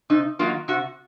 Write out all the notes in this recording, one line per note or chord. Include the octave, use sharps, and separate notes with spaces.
C3 D#4
D#3 F#3 A#3 F4
C3 F#4